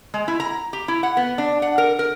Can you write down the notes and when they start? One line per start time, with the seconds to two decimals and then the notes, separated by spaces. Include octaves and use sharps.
0.14 G#3
0.28 E4
0.40 A#5
0.73 G4
0.88 E4
1.03 F#5
1.17 B3
1.38 D4
1.62 F#5
1.78 A#4
1.99 A#4